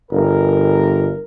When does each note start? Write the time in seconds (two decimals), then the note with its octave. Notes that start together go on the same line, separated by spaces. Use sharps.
0.11 G1 A#4